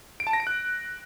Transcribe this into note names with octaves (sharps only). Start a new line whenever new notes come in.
D7
A5
A#6
D7
F#6